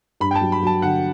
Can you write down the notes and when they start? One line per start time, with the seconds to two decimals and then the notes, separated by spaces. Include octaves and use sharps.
0.20 G2 B5
0.31 G5
0.35 A5
0.41 F#3
0.52 B5
0.63 F#3 A5
0.82 D3 F#5